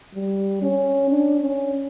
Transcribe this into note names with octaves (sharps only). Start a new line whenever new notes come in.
G3
C#4
D4
C#4